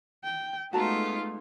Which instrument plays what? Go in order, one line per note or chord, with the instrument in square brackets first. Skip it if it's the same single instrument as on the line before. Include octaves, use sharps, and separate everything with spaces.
[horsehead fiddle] G5
[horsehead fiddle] G#3 D#4 [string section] A3 [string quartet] B3 F4 [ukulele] F#4 A5 A#5